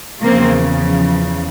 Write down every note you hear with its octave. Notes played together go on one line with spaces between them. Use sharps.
E2 C#3 F3 A#3 C4